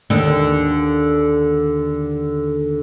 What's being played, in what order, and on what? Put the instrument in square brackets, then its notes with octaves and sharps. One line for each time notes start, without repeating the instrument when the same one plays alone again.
[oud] D#2 D3